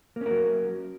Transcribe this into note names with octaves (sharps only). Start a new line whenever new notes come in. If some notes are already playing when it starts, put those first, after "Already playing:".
F#3 A#3 C#4 A#4